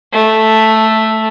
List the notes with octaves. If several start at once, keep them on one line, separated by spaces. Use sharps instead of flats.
A3